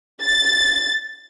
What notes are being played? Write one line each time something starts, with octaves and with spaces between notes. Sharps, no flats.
A6